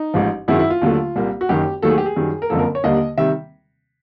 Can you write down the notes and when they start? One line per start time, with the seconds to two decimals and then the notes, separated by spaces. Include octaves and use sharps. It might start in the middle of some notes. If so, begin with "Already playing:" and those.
Already playing: D#4
0.14 A1 G#2 F3
0.48 G#1 F#2 D#3 G#3 E4
0.59 E4
0.70 F4
0.81 D#2 D3 F#3 A3
1.16 C2 A#2 G3 A#3
1.41 F#4
1.49 F#1 F#2 D#3 F#3 G4
1.82 D#2 D#3 F#3 A3 A4
1.91 G#4
1.98 G4
2.06 G#4
2.16 F#2 D#3 G3
2.42 A#4
2.50 F#1 F2 D3 F3 A#3 A4
2.59 A#4
2.75 C#5
2.84 D#2 D3 G3 A#3 D#5
3.18 C3 D#3 G3 E5